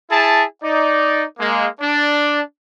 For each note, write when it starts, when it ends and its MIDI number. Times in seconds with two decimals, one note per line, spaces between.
0.11 0.43 64
0.11 0.43 68
0.11 0.43 81
0.62 1.23 63
0.62 1.23 74
1.39 1.67 56
1.39 1.67 58
1.80 2.40 62
1.80 2.40 74